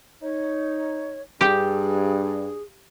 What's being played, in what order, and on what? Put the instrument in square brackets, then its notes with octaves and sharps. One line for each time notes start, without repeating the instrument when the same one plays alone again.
[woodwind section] D#4 [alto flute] C#5
[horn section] G2 [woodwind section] D4 [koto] G4 [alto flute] G#4